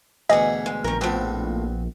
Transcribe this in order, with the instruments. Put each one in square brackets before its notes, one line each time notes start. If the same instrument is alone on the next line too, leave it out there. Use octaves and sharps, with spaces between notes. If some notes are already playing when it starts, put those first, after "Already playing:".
[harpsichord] D2 B2 E3 [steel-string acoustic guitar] G#4 F#5 [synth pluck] D#5
[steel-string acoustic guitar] G#3
[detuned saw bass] A#1 [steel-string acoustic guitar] D#3 A#4
[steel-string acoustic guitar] A2 F3 [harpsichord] B3 C4 F#4